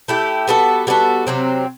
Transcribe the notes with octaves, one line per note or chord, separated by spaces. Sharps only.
A3 E4 G4
G3 B3 F#4 A4
G3 B3 F#4 A4
C3 F#3 C4